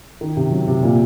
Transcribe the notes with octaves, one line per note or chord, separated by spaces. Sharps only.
D#3
C3
F#3
C3
A#2